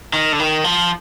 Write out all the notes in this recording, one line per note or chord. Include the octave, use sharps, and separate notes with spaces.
D#3
D3
D#3
F3